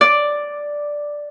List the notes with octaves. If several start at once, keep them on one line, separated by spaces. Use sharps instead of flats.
D5